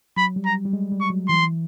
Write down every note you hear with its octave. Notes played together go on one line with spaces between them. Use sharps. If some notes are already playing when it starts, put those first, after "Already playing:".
F#3 B5
G3
A#5
G3
G3
G#3
G3
C#6
F#3
E3 C6